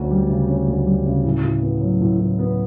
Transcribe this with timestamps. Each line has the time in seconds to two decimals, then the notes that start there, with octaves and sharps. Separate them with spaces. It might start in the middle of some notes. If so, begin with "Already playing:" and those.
Already playing: D2 C#4
0.11 G3
0.30 C#3
0.49 C#4
0.68 D2
0.86 G3
1.06 C#3
1.25 A2
1.44 A2
1.62 B3
1.81 F#3
2.01 A2
2.19 A2
2.39 B3